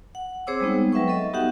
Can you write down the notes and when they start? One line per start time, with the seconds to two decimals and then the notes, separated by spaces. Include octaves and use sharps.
0.15 F#5
0.47 C4 G#4 C5 C#5 D6 E6
0.60 G3 G#3 B3 D#4
0.92 F#3 B4 E5 F#5 G5 C#6
1.08 A4 D#5 E5
1.33 B3 D#4 F#4 G4 E5 F#5